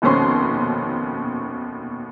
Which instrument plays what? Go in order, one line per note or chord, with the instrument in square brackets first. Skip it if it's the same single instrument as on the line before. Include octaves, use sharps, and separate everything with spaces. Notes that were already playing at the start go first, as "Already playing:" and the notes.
[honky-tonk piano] F1 D#2 B2 C4 C#4 C6